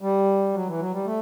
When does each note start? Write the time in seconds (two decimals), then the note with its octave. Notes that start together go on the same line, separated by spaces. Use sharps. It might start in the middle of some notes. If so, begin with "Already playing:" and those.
0.01 G3
0.54 F#3
0.67 E3
0.79 F#3
0.92 G3
1.05 A3